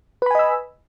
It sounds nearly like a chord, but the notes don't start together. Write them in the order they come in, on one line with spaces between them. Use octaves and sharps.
B4 B5 G#5 D#5 E6